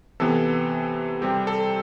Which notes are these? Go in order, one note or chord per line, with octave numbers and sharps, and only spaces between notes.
C3 E3 B3 A4
C3 G3 C4 G4
A4